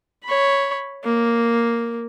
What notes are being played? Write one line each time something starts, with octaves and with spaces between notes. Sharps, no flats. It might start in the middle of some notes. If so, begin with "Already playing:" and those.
C#5 B5
A#3